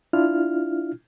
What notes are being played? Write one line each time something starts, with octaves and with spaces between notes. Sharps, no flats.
D4 E4 F4 F6